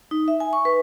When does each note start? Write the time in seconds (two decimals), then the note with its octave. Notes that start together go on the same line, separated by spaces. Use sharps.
0.11 D#4
0.28 E5
0.40 G#5
0.53 C#6
0.65 B4